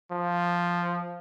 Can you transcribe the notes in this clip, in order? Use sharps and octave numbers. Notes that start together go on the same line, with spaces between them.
F3